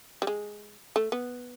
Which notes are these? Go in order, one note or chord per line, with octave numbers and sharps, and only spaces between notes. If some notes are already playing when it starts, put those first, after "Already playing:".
G3
G#3
A3
B3